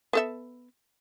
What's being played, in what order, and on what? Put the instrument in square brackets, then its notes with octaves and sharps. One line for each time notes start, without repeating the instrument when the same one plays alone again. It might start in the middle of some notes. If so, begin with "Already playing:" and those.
[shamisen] B3 A4 E5